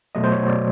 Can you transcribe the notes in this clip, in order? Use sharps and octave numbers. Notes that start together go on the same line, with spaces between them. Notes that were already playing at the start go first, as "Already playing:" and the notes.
B2 F#3 A3 D#5
C5
C#5
D5